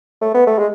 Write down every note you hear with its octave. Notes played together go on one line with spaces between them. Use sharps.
A3
B3
A3
G#3